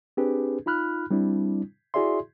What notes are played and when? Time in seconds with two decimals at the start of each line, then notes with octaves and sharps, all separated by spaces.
0.17 C4 D4 G4 G#4 B4
0.66 D#4 F4 B5 F6 F#6
1.11 G3 C4 D4 E4
1.94 E4 F#4 G#4 D5 E5 C6